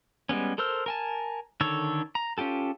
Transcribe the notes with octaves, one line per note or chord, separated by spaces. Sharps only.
G3 G#3 B3 C#4
A4 A#4 C5 E6 F6
A#4 G#5 A5
D3 D#3 A4 C#5 E6
A#5
C#4 F4 G4 A4